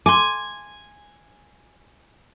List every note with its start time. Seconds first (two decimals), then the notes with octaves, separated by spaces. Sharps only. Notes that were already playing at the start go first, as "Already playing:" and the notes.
0.06 G#5 C6 D6